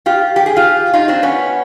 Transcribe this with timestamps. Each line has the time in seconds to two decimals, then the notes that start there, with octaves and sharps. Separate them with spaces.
0.06 F4 G4
0.36 G4
0.46 G#4
0.57 F4 G4
0.94 D#4 F4
1.08 C4 D4
1.23 B3 C#4